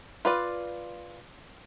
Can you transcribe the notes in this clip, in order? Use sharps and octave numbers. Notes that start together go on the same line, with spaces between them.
F4 B4 D5